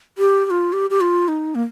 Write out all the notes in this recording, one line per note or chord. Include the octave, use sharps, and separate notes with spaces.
G4
G4
F4
G4
G4
F4
D#4
A#3